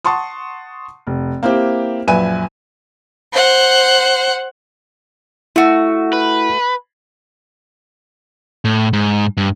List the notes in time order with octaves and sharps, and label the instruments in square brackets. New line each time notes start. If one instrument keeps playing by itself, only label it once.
[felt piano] F#5 A5 C6 C#6 D#6
F1
A#3 C4 E4 G4
A#1 F#2 B4 E5 G#5 D#7
[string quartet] C5 F#5
[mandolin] A3 F#4 [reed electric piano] E4
[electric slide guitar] B4
[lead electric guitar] A2
G#2
G2